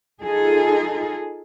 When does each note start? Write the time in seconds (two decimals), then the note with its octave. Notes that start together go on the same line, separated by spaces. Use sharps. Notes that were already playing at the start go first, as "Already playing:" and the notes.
0.23 D#4 F4 G#4 A4